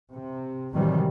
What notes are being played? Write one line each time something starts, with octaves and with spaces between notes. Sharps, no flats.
C3
A2 C3 D#3 E3 F#3 G3